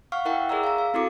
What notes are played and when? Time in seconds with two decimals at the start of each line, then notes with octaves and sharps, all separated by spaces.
0.12 F5 F#5 C#6 F6
0.25 E4 A#4 E5 F#5 G5 C#6
0.49 G#4 A#4 D5 A#5 E6
0.64 F5 A#5
0.78 F5
0.94 C4 E4 F#4 A4 D6 C#7